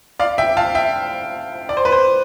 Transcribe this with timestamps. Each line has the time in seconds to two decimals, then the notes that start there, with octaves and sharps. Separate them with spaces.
0.19 D5 F5
0.38 E5 G5
0.57 F5 A5
0.75 E5 G5
1.69 D5
1.77 C5
1.85 B4
1.92 C5